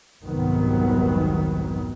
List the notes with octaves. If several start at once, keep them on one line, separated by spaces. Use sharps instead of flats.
F1 C2 G#2 D#3 F#3 B3